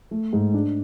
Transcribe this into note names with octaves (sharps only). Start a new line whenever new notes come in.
A3
G#2
D4